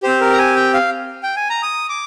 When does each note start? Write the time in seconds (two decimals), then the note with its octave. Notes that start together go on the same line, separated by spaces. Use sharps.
0.03 C4 G4 C5
0.21 A#4
0.33 A#5
0.38 G#5
0.56 G5
0.74 F5
1.23 G5
1.36 G#5
1.50 A#5
1.63 D#6
1.89 D6